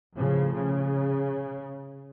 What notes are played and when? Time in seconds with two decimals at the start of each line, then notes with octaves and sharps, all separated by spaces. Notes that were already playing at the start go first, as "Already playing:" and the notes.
0.15 A2 C#3 F3
0.53 C#3